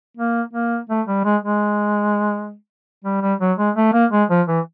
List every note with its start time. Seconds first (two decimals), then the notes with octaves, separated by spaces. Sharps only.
0.17 A#3
0.53 A#3
0.89 A3
1.07 G3
1.25 G#3
1.42 G#3
3.04 G3
3.22 G3
3.40 F#3
3.58 G#3
3.76 A3
3.93 A#3
4.12 G#3
4.30 F3
4.47 E3